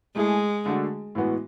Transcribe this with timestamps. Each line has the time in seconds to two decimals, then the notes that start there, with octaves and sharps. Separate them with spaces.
0.16 G#3 A3 E4 G#4
0.66 D3 A3 D4 F#4
1.15 A2 E3 G#3 B3 F#4